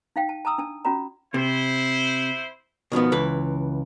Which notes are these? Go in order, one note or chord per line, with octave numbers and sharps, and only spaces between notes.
D#4 F5 G5
A5
A5 A#5 D#6 E6
D4 A5
C#4 F4 F#4 D5 A#5
C3 E4 C5
B2 D#3 F3 B3
C#2 E3 B4